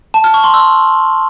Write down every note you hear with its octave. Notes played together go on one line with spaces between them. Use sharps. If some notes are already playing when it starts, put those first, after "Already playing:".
A5
F6
C#6
C6
E6